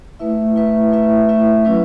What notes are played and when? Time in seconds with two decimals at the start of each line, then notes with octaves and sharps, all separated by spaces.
0.19 A3 E4 B4 E5
0.56 A3 E4 B4 E5
0.92 A3 E4 B4 E5
1.29 A3 E4 B4 E5
1.65 F#3 C#4 E4 B4